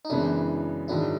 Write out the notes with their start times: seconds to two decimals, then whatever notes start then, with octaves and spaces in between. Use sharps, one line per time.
0.05 D#4
0.10 F#2 C#3 E3 G#3 B3 D4 E4
0.88 G#2 D#3 F#3 D4 E4